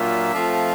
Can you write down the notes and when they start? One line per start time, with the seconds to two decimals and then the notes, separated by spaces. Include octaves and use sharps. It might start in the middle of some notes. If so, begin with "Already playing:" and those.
Already playing: A#2 F#3 A#3 D4 F4 E5
0.35 F3 A3 C4 F4